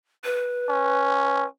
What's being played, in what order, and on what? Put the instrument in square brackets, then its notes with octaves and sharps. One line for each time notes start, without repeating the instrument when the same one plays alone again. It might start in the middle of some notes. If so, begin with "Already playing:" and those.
[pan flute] B4
[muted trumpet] C#4